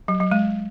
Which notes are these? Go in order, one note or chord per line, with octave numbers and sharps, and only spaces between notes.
F#3
F#3
G#3